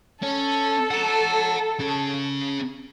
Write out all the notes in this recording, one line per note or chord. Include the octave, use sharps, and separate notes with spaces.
C#4 A4
F#5 A#5
C#4 G#4